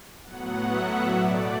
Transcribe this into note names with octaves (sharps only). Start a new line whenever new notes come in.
A2 F#3 B3 F#5
E5
B2 A3 D5